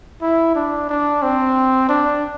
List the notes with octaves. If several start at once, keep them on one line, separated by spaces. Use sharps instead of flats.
E4
D4
D4
C4
D4